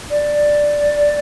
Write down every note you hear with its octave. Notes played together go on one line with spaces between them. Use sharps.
D5